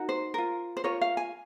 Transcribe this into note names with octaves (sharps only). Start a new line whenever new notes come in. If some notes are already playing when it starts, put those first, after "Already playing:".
Already playing: D#4 F#4 A#4
C5
F4 A#4
C5
F4 A#4 C#5
F5
G#5